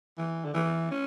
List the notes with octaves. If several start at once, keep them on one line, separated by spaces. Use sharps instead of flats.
E3
D3
E3
C#4